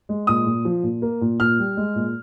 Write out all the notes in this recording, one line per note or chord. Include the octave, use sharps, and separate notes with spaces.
G#3
A#2 D#6
A#2
F3
A#2
A#3
A#2
A#2 F6
G3
G#3
A#2